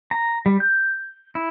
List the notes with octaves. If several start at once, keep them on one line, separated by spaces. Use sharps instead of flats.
A#5
G3
G6
E4